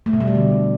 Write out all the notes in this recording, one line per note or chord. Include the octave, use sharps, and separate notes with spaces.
A3
B2
G3
A3
D3